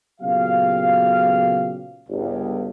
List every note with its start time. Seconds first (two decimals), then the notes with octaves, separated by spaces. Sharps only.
0.21 A#2 C#3 F#3 B3 G4 F5
2.09 G1 C#2